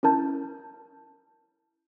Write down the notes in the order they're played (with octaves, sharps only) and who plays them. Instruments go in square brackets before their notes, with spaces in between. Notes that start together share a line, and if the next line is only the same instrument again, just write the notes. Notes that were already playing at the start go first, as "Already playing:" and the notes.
[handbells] C#4 E4 A#4 A5 G6